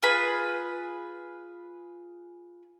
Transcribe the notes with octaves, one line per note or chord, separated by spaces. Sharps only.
F4 G#4 B4 B5